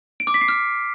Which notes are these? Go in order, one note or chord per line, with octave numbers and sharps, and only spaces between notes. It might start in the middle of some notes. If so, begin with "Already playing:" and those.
D7
D6
B6
C7
F6